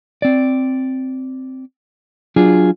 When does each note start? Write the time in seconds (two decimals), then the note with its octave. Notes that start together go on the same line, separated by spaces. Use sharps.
0.22 C4 D5
2.36 F#3 D4 F4 G#4